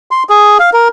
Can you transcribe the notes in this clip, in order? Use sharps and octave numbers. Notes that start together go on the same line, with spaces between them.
C6
G#4
F5
A#4